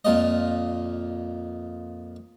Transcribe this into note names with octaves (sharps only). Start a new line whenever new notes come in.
F2 A#2 F4 D#5